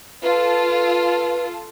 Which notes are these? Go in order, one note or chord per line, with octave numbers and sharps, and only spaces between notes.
F4 A4 B4